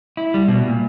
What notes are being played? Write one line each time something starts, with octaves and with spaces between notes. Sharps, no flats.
E4
G3
B2
A#2